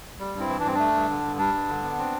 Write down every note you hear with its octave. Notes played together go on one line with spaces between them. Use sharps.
G3
G2 C4 E4
E3
D4
G2 C4
A3 D4
G2
D3
G2
G3 D4
G2
D3
B3
C4